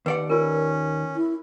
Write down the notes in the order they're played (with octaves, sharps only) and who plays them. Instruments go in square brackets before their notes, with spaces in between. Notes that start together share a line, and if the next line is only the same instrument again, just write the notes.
[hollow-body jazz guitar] D#2 D5 F#5 [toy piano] B4
[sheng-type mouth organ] C#4 [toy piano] F4 A#4
[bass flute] E4